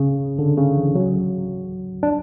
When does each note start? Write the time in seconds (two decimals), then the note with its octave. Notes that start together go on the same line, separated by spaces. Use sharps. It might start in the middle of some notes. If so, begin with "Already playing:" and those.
Already playing: C#3
0.39 D3
0.57 C#3
0.76 E3
0.95 F#3
2.03 D4